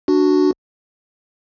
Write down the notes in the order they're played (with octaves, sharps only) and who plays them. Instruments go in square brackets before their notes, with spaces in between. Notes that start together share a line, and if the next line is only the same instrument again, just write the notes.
[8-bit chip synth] D4 F#4